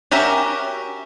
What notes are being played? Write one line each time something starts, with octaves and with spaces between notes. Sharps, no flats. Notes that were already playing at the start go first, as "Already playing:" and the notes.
C#4 F#4 G4 A#4 E5